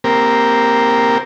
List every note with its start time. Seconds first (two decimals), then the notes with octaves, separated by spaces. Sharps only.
0.04 A#3 C4 G4 A#4